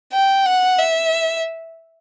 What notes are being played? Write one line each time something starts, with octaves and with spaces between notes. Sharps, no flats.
G5
F#5
E5